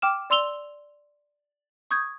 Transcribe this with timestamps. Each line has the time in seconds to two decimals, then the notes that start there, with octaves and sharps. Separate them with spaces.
0.02 G5 D6 F6 E7
0.30 D5 C6 E6 F7 G7
1.91 C#6 D#6 G6 G#6